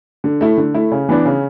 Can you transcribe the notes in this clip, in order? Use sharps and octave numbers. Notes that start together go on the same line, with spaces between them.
D3
A3 E4
D3
A3 E4
C#3
E3 B3 D4
C#3